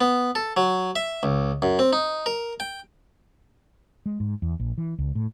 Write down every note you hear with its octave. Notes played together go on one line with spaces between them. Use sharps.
B3
A4
F#3
E5
C#2
F#2
C4
D#4
A#4
G5
G#3
G#2
E2
A#1
E3
C#2
A2